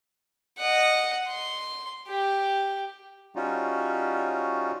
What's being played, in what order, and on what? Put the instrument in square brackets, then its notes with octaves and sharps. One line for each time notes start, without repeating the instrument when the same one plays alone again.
[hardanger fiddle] D#5 F#5
C6
G4
[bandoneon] G3 C#4 D#4 F4 F#4